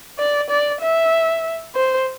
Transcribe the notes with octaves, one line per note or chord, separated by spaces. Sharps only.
D5
D5
E5
C5